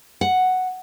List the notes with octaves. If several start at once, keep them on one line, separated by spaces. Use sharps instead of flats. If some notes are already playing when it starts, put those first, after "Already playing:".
F#5